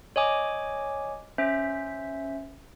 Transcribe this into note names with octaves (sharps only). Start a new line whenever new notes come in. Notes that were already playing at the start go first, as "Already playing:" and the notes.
C#5 D#5 G#5 D6
C#4 C5 E5